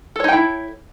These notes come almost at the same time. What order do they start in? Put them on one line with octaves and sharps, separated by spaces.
A4 C#5 D#4 G5 E4